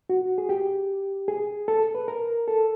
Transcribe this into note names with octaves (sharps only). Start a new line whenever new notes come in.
F#4
G#4
G4
G#4
A4
B4
A#4
A4